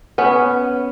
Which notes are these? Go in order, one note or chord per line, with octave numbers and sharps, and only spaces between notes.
B3 C#4